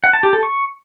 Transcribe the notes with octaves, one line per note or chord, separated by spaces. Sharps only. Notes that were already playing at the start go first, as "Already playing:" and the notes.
F#5
A5
G4
A4
C#6